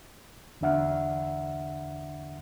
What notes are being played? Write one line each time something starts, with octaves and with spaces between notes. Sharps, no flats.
E2 D3 D4 E5 F#5 F6